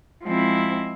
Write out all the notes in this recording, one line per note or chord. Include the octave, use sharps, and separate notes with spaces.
F3 G#3 C4 E4